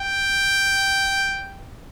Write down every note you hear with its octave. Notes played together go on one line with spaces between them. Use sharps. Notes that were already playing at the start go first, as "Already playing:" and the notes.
Already playing: G5